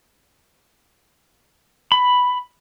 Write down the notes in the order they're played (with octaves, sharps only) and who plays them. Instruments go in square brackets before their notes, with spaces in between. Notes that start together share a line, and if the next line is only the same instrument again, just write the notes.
[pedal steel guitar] B5